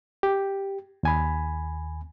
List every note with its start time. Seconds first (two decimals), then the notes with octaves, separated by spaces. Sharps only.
0.23 G4
1.03 D#2 G#5 B5